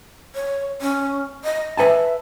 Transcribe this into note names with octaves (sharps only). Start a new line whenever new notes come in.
C#5
C#4
D#5
B4 E5 G#5 A5